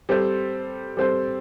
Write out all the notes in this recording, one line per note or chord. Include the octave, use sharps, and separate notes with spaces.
G3 C4 A4 C5
G3 C4 A4 C5